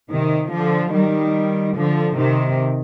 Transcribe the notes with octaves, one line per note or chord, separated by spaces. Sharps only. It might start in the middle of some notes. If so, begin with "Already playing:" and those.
C3 D#3
D3 F3
D#3 G3
D3 F3
C3 D#3